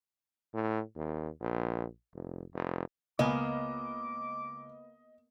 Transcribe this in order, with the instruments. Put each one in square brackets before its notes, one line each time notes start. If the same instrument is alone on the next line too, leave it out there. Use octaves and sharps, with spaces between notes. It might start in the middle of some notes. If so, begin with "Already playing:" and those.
[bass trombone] A2
D#2
A#1
F1
F1
[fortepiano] C#2 G#5 B5 [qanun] A#3 B3 [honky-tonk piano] D#5 [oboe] D6